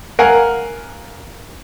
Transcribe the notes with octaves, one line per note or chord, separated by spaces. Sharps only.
A#4 F5 F#5 G#5